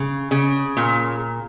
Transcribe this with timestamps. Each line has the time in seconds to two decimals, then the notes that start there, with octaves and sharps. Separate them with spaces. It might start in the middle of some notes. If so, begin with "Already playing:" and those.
Already playing: C#3
0.31 C#3
0.77 A#2